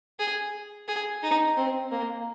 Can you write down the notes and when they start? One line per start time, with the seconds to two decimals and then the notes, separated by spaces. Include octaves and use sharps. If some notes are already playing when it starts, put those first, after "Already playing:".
0.19 G#4
0.88 G#4
1.23 D#4
1.57 C4
1.91 A#3